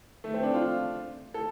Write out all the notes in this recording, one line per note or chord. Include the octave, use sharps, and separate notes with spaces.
A3
C4
D4
F4
A4